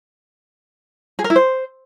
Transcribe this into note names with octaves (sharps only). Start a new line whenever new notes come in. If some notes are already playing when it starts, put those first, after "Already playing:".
G#4
A#4
E4
C5